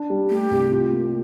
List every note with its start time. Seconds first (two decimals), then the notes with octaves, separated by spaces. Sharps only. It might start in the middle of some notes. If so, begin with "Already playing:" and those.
Already playing: D4
0.10 G3
0.30 A3 G4
0.51 C2
0.72 F4
0.93 A#3